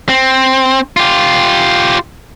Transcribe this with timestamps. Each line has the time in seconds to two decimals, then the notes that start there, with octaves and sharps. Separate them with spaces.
0.09 C4
0.97 F4 G4